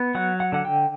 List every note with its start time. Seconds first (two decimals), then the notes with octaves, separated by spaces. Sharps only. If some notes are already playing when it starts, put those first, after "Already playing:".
Already playing: B3
0.15 F#3 F#5
0.40 F#5
0.52 D3 F#5
0.65 G5